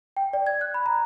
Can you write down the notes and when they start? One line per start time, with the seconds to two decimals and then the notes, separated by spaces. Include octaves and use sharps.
0.17 G5
0.33 D5
0.47 G#6
0.61 F#6
0.74 B5
0.86 A#5